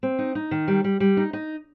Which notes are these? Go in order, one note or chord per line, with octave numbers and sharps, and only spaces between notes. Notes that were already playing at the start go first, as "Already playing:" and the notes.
C4
D#4
D#4
D#3
G3
G3
G3
D#4
D#4